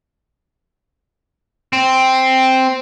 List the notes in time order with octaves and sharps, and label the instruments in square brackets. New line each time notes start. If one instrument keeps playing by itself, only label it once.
[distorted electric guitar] C4